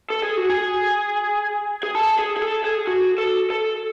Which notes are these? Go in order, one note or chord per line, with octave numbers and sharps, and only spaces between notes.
A4
G#4
F#4
G#4
G#4
A4
G#4
G#4
A4
G#4
F#4
A4
A4